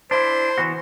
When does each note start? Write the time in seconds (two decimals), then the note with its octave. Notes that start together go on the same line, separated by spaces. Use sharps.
0.11 D4 E4 C5
0.58 E3 B3 F#4